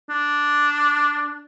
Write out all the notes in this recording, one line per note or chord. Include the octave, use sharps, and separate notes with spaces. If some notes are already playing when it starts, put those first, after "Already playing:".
D4